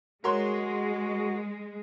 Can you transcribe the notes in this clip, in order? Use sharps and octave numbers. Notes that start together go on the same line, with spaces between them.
G#3 F#4 A#4 C#5 C6